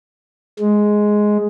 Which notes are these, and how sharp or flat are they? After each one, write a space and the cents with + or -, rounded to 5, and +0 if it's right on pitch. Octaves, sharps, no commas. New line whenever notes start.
G#3 +5